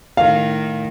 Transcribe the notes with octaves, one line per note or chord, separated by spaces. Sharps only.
A2 D#3 F5